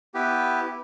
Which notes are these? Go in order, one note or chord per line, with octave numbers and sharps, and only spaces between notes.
B3 E4 G4 B4